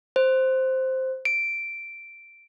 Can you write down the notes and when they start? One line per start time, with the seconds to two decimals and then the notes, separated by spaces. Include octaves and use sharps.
0.16 C5
1.25 D7